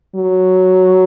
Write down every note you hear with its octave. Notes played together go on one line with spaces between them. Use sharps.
F#3